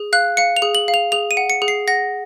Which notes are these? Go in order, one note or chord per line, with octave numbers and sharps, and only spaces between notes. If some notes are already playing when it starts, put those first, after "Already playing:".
Already playing: G#4
F5 F#6
F5 C#7
F7
G#4
F#7
F5
F7
G#4 F7
D#7
F#5
C#7
G#4
C7
F#5 A#6